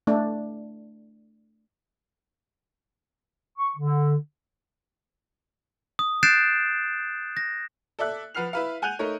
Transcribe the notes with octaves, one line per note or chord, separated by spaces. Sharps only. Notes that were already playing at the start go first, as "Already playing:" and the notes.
A3 D4
C#6
D3
D#6
F#6 G6 A6 C7 D7 E7
A#6
A4 D5 E5 F#6
F3 B4 F#5 F6 C7 F7
E4 B4 F5
F#5 G#5 F#6 G6 D#7 F7
A3 D#4 A#4 C#5